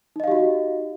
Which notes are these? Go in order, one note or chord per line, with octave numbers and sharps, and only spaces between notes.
D#4 F#4 G4 D#5 F5